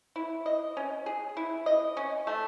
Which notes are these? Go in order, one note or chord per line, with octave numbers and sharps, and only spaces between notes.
E4
D#5
C#4
G#4
E4
D#5
C#4
A3